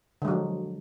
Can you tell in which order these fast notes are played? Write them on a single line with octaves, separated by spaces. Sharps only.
D3 G#3 F#3 F3